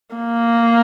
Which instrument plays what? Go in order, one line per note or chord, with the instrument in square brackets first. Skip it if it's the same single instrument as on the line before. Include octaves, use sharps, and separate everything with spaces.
[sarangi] A#3